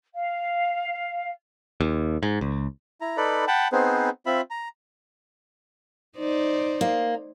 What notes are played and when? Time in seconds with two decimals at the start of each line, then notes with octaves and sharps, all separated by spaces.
0.13 F5
1.81 D#2
2.23 G#2
2.41 C#2
3.01 E4 A#5
3.17 D#4 A4 B4 D5 B5
3.48 F#5 G5 A5 B5
3.72 B3 C4 D#4 G#4 B4 C5
4.26 C4 F4 E5 B5
4.51 A#5
6.18 D#4 C5 D5
6.81 A#3